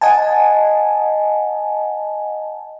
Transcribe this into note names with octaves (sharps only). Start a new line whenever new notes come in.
D#5 F#5 G#5 A5